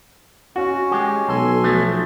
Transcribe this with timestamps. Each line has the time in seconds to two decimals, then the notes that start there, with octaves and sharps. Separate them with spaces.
0.56 C#4 F#4
0.91 G#3 G4
1.29 B1 A4 G#5 C6
1.64 F3 F#3 A3